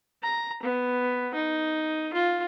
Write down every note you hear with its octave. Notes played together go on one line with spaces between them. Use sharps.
A#5
B3
D#4
F4